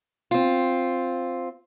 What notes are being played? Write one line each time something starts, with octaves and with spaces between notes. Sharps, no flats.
C4 F4